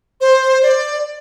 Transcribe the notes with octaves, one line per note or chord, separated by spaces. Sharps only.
C5
D5